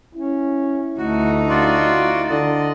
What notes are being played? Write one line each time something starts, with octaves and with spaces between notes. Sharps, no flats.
C#4 E4
D2 A3 D#4 F#4
F4 F#4 D5
D3 D5 D#5